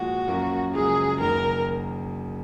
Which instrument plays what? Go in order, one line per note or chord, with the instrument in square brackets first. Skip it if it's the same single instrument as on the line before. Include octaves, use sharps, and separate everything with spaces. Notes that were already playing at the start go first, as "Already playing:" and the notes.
Already playing: [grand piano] A#2 F3 G#3 [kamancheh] F#4
[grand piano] F#2 F3 A#3
[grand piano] F#1 F#2 F3 G#3 [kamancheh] G#4
[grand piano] F#1 F#2 D#3 [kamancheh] A#4